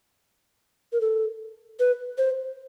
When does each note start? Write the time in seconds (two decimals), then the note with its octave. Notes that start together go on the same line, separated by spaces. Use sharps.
0.92 A#4
1.01 A4
1.79 B4
2.18 C5